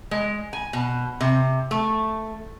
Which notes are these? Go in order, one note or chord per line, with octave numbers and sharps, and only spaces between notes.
G#3
G#5
B2
C3
A3